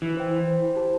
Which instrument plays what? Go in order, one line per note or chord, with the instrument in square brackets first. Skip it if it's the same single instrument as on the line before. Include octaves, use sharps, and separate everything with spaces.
[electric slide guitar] E3 [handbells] E4
[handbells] C5 G5
E4
C5 G5
E4
G4 C5 A5